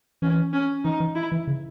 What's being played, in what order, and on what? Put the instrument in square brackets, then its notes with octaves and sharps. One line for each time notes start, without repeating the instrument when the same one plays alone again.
[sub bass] E3 [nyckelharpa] C#4
[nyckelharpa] C#4
[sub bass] E3 [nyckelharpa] D#4
[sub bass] E3
[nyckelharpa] E4
[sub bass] E3
C#3